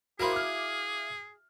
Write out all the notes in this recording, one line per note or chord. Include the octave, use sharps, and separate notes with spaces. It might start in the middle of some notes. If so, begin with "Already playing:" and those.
E4 F#4 G#4 A#4 C5 F5 F#5 B5
D6 F6